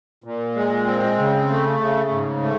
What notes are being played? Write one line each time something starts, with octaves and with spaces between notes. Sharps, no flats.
A#2
G#3
C4
C#3
A3
C#3
G#2
A3